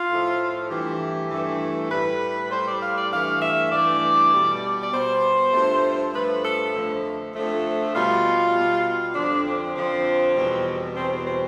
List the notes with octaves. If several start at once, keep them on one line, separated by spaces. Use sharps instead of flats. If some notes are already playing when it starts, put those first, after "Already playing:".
Already playing: F4
A2 F3 A3
G2 E3 A3 G4
G2 E3 A3
A2 G3 B4
A2 G3 C5
D5
F5
D5
G2 E3 A3 F5
E5
G2 E3 A3 D5
B2 G3
D5
B2 G3 C5
G2 F3 A3
G2 F3 A3 B4
A4
F2 D3 F3 A3
F2 D3 F3 A3
B2 G3 F4
B2 G3
F2 D3 F3 D4
C4
F2 D3 F3 C4
E2 B2 G3
E2 B2 G3 C4
C4
C4